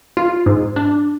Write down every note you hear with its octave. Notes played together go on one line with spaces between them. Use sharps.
F4
G#2
D4